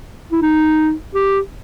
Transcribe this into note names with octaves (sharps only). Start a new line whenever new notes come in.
E4
D#4
G4